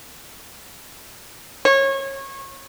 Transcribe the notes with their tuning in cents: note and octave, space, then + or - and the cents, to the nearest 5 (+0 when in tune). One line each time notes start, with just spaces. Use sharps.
C#5 -25